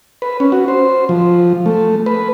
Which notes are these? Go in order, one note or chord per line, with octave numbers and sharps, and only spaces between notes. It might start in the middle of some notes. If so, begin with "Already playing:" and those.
B4
C#4
F#4
C5
F3
A3
B4